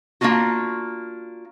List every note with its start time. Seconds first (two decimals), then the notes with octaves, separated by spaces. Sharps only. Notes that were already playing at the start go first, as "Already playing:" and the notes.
0.21 A#3 C#4 D4 F4 F#4